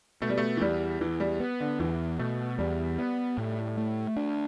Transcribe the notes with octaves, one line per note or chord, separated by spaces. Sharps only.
B2 A3
G3
A3
E3
E2 G3
E2 E3
G3
B3
D3
E2 E3
B2 A3
E2 G3
B3
A2
A3
D4